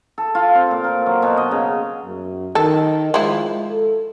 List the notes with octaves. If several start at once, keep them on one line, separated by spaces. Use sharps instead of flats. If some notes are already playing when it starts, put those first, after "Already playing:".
A4
F4
C4
A#2
A#4
F#3
B2
D#5
C#3
F#2
D#3 A4
F3 G#3 E4
A4